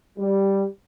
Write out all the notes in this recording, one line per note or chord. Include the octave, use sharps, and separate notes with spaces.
G3